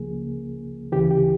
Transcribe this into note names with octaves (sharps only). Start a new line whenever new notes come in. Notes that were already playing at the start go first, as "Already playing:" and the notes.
Already playing: C#2 C#3 F3 A#3 G#4
D2 C#3 E3 G4
G4